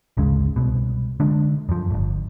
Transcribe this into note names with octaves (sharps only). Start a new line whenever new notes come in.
G#1 D2 C#3 G#3
C2 B2
D3 G#3 D4
F#2 F3
D1 G1